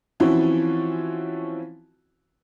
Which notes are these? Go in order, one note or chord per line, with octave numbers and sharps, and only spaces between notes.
E3 F3 C4 C#4 E4 F#4